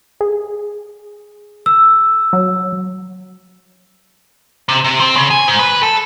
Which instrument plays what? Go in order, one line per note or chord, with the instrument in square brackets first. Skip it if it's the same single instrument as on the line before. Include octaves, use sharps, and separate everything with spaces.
[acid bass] G#4
[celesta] E6
[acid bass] F#3
[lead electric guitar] C3
C3
C4
C#3
G#5
G#2
B4
A4